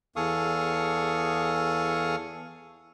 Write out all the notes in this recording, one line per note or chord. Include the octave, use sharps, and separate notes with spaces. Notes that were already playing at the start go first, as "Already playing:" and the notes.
E2 G#4 A4 F5 C#6 D#6